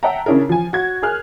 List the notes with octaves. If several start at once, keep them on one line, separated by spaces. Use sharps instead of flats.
E5 F#5 G5 A5 A#5
C#3 C#4 D4 E4 G#4 A#4
F3 G#5
F#4 G#6
G#4 A#4 G#5 F6 F#6